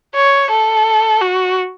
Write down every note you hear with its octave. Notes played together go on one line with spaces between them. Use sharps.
C#5
A4
F#4